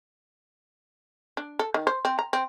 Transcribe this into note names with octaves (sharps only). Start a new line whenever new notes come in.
D4
A4
D#3
C5
C4
A#5
C4